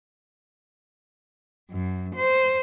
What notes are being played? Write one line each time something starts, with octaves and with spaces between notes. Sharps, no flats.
F#2
C5